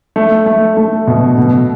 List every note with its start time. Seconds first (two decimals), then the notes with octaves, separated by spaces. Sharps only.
0.16 A3
0.46 A3
0.77 A3
1.07 B2
1.38 B2